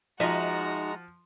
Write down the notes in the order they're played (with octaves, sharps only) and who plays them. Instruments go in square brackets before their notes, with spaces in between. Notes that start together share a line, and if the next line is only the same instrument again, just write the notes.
[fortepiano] F3 [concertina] G#3 A#5 [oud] D#4 D#5 E5 [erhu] F#4